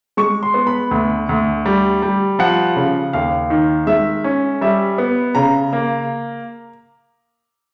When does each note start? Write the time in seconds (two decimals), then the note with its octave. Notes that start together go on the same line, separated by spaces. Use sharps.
0.17 G#3 C#6
0.43 C6
0.54 B3
0.67 B5
0.91 D2
1.29 D2
1.66 G3
2.02 G3
2.39 F3 F#5
2.76 C#3
3.13 D#2 F5
3.50 D#3
3.87 G#3 E5
4.24 C#4
4.61 G3 E5
4.98 B3
5.35 C#3 A#5
5.73 A#3